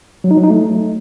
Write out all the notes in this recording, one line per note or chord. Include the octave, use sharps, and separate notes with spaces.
F#3
D#4
F#3
D#4
A3